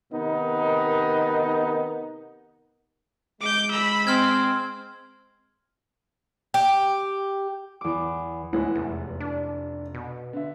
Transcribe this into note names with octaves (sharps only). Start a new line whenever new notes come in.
C3 D#3 B3 D#4 A#4
G#3 D6 G6
B5 E6
C4 C6 F6 G#6
G4
E2 D6
D2 A2 E3 G#3 F#5
F1 E2
D4
B2
D3 E5